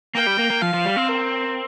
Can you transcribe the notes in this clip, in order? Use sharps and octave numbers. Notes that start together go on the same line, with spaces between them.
A#3 G5
G3
A#3
A#3
F3 F5
F3
G3
C4
A#4